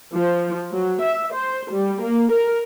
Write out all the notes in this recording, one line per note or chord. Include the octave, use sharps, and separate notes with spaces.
F3
F#3
E5
C5
G3
A#3
A#4